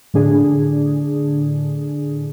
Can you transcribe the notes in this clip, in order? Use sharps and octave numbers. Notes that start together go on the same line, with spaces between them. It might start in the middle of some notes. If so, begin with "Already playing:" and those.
A2 D3 D4 G#4